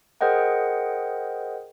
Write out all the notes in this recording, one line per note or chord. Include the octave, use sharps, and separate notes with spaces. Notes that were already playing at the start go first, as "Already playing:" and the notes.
G#4 A#4 C5 D#5 F#5 G5